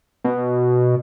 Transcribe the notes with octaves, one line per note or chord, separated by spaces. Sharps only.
B2